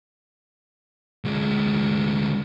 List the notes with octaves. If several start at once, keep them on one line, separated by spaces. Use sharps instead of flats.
D2 G#3